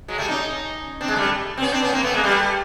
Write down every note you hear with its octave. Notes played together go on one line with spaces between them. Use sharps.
F#3 G#3
G3 A3
C#4 D#4
C4 D4
G#3
G3 A3
C4
B3 C#4
C4 D4
B3 C#4
A#3 C4
A3 B3
G#3 A#3
G3 A3